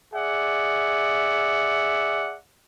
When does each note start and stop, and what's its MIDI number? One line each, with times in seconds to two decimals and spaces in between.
0.14 2.36 68
0.14 2.36 74
0.14 2.36 76
0.14 2.36 78